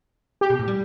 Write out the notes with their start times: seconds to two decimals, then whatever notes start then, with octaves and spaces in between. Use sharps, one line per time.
0.41 G4
0.50 B2
0.59 A2
0.68 G3